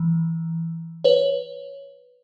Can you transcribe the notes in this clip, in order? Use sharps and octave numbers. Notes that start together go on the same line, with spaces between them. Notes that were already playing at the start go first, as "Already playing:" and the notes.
Already playing: E3
B4 C#5